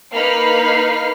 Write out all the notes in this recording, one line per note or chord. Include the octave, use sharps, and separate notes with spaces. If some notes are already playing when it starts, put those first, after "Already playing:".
A#3 D#4 B4 B5 F6 C7